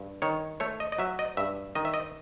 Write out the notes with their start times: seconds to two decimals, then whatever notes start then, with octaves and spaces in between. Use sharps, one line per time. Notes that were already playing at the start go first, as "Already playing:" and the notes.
Already playing: G2
0.22 D#3 C#5
0.60 A3 C#5
0.80 D#5
0.92 D#5
0.99 F#3 E5
1.19 D#5
1.37 G2 E5
1.75 D#3 D#5
1.85 E5
1.94 D#5